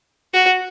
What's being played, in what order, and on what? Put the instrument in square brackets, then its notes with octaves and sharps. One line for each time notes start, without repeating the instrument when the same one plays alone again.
[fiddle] F#4